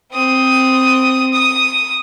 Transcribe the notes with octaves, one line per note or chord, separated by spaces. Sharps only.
C4 D#6
D#6